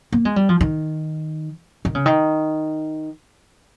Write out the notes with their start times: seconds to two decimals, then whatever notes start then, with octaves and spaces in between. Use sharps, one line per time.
0.12 A#3
0.25 G#3
0.36 G3
0.49 F3
0.61 D#3
1.85 D#3
1.95 C#3
2.06 D#3